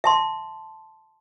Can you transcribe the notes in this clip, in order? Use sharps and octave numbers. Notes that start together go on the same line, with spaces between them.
E5 A5 C6